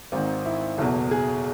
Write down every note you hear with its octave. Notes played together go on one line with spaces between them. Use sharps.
G#1 G#2 D#3 C4
E4
F#1 E2 B2 A4
G#4